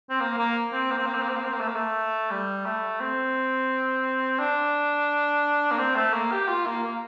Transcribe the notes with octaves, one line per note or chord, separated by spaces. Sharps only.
C4
A#3
A#3
C4
A#3
C4
A#3
C4
A#3
C4
A#3
C4
A#3
A3
A#3
A3
G3
A3
C4
D4
A#3
C4
A3
A#3
G4
F4
A#3
A#3